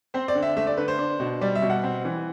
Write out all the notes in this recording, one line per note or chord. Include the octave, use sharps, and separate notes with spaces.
C4 C5
D5
D3
E5
A3 E5
D5
D3 B4
C5
D4
B2
G3 D5
E5
B2
F#5
C4
E3